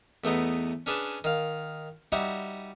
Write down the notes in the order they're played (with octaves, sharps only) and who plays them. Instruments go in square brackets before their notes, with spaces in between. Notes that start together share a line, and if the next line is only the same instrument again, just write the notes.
[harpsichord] E2 A3 B3 D#4
C#4 D4 G#4 B4 A5
D#3 F5
G3 D#4 E4 F#4 D#5